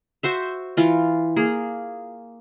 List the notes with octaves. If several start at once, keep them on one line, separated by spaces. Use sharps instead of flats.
F#4 C5 E5
E3 F4
A#3 G#4